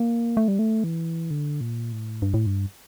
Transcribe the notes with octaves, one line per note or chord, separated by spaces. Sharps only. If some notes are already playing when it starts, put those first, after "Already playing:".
Already playing: A#3
A3
G3
A3
E3
D3
A#2
A2
G2
A2
G2